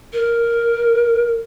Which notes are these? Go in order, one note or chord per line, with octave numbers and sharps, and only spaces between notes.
A#4